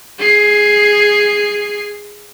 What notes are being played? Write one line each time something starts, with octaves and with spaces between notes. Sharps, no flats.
G#4 C7